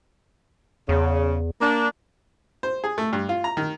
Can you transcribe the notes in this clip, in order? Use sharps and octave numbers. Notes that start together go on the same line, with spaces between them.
E2 C#3
A#3 D4
C5
G#4
A3
G2
F4
A#5
D#3